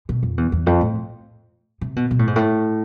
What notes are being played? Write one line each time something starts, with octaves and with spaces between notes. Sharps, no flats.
B2
F2
E2
E2
F2
A2
C3
B2
B2
A2
G#2
A2